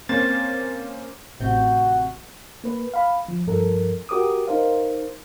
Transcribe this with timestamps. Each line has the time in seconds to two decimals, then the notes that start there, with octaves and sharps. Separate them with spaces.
0.09 A#3 C4 C#4 C5 A6
1.40 A1 C3 F#4 G6
2.64 A#3 B4
2.94 F5 B5
3.28 F3
3.47 G2 F3 A4 A#4
4.09 F#4 G4 A#4 D6 D#6
4.47 D#4 A#4 C5 F5